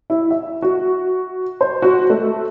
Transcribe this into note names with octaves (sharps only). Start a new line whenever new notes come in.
E4
E5
F#4
C5
F#4
A3